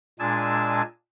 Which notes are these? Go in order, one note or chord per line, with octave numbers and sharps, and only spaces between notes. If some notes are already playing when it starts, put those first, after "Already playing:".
A#2 G#3 D4 G#5 A5 E6